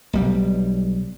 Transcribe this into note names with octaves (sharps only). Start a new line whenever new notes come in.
B1 G3